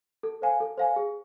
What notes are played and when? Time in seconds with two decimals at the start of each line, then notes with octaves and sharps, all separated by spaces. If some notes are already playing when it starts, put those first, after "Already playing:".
0.23 A4
0.42 C5 F5 G#5
0.60 A4
0.78 C5 F5 G#5
0.96 G#4